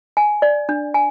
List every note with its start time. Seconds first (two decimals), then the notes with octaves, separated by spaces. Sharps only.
0.17 G#5
0.42 D5
0.69 D4
0.94 G#5